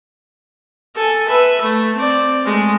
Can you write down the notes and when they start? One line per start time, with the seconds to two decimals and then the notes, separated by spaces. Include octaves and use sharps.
0.95 A4 G#5
1.28 B4 E5
1.63 A3
1.96 C4 D5
2.46 G#3 A3